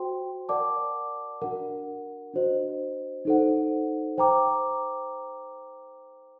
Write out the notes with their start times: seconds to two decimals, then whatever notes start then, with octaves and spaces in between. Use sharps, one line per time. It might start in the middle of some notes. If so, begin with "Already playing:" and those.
Already playing: F#4 C5 G5 C6
0.49 A#4 D5 F#5 A5 D6
1.42 D4 F#4 A#4 F#5
2.34 D4 F#4 C5 D#5
3.25 D#4 A4 C5 F#5
4.18 C5 G5 A#5 D6